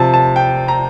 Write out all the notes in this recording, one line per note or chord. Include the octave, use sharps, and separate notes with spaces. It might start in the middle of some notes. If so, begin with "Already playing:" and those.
Already playing: C3 F3 C4 A5
A5
G5
A#5